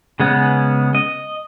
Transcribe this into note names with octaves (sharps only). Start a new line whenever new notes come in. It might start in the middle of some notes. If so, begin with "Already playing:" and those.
C#3 G#3 B3 C#4
D#5